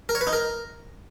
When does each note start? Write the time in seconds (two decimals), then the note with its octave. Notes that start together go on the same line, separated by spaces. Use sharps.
0.09 A#4
0.15 C#5
0.21 B4
0.27 D#4
0.33 A#4